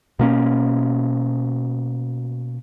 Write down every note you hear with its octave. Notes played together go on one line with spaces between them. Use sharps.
B2 A#3 C#4